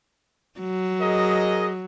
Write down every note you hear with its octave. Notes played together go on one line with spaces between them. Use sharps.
F#3
G#4 A#4 D#5